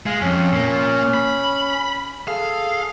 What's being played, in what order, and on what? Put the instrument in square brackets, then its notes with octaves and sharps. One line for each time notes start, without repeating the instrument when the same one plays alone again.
[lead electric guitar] G#3 [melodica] F5 G#5
[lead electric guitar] F2 [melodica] C#4
[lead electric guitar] A#2 A#3
B5
[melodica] G#4 A4 [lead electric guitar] F5